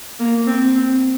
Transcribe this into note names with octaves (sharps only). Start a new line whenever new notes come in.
A#3
C4
C4